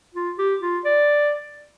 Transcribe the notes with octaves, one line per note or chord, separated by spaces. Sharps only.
F4
G4
F4
D5